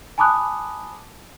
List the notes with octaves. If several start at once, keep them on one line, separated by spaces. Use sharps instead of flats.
G#5 A5 B5 D6 D#6 F#6